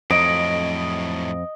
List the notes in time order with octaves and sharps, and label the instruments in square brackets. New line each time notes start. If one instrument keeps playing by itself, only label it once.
[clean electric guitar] F2 [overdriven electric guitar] A2 F#3 [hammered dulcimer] D#5 [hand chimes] D7